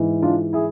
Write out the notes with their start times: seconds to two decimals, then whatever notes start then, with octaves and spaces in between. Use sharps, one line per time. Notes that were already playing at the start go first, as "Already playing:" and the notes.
Already playing: G#2 E3
0.22 D4 F4
0.53 E4 G#4